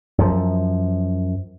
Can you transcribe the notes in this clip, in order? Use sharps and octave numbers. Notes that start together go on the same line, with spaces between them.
F#2 F3